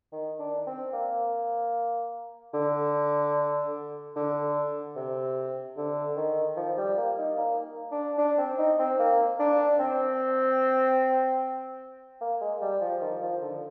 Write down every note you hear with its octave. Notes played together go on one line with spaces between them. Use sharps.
D#3
D4
C4
A#3
D3
D3
C3
D3
D#3
F3
G3
A#3
D#4
A#3
D4
D4
C4
D#4
C4
A#3
D4
C4
A#3
G#3
G3
F3
D#3
F3
D3